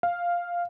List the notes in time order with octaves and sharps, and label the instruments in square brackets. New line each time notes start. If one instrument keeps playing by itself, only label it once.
[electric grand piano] F5